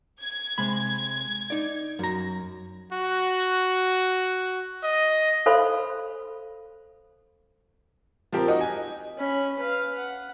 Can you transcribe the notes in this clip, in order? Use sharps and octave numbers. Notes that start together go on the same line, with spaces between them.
G#6
C3 G#3 B5
D#4 D5
F#2 A#5
F#4
D#5
A4 C5 F5 B5 C6
F3 C4 G4 A#4
D#4 F#4 D#5
G#5
C#4 B5
B4 F5
F#5